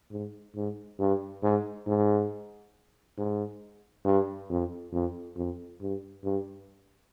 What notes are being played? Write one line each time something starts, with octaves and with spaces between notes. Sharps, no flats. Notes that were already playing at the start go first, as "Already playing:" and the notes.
G#2
G#2
G2
G#2
G#2
G#2
G2
F2
F2
F2
G2
G2